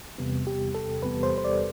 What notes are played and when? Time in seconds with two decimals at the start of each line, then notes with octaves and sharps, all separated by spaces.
0.18 E2 C3 G3 B3
0.47 G4
0.75 A4
1.03 E2 C3 G3 B3 B4
1.23 C5
1.38 C5
1.44 D5